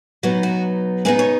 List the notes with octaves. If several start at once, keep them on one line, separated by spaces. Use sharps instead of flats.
B2 F#3 B3 D#4 F#4
F#4
C#3 B3 D#4 G#4
C#5